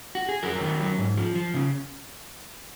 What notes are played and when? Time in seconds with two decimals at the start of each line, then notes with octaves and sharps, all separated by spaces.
0.15 F#4
0.29 G#4
0.43 F2 F#4 A#4
0.61 D#3
0.80 F#3
0.98 G#2
1.17 F3
1.35 F3
1.54 C#3